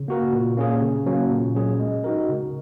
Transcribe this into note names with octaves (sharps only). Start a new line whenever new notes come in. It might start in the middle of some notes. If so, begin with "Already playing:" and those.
Already playing: C#3
A#3 F#4 A#4
A#2
A#3 C#4 G#4
C#3
F#3 A#3 C#4
A#2
F#3 C#4 G#4
G#3
D#4 F#4 A#4
C#3